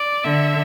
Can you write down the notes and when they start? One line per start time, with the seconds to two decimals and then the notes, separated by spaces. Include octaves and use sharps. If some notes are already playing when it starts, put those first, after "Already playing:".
Already playing: D5
0.24 D3 E5